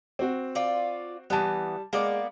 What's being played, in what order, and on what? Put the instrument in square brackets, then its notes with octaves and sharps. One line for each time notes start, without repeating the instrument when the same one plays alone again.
[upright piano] C4 F#4
[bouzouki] F4 D5
[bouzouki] E3 B3 [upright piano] G3 A5
[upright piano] G#3 [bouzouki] A#3 B3 D5